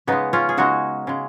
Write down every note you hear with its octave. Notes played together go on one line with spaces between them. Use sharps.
C#3 G#3 B3 D#4
C#4 F4
G#4
C#3 G#3 D#4 F#4
C#3 G#3